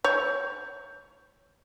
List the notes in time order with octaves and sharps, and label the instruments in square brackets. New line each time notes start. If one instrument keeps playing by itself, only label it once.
[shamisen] C#5 [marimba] G6